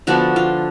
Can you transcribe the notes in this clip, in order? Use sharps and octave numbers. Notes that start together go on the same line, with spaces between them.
D3 F3 B3 D4 F#4
F4